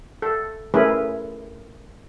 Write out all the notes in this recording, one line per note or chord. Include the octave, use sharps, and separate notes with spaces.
A4
A3 C#4 E4 G#4 A#4 B4